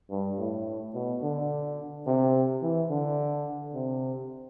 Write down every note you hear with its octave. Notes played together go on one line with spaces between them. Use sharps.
G2
A2
B2
D3
C3
E3
D3
C3